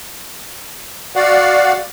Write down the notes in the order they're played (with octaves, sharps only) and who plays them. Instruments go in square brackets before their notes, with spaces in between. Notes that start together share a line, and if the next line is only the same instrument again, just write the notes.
[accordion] F#4 D5 F5 F#5